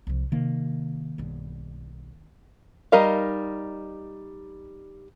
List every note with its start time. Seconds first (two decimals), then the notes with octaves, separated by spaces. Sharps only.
0.07 C2 F3
0.32 C3 D#3 A#3
1.18 B1 G2
2.92 G3 D#4 A#4 D#5 F5